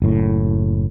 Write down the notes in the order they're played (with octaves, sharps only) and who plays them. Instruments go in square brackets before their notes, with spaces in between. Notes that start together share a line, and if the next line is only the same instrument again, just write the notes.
[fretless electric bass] F#1 A2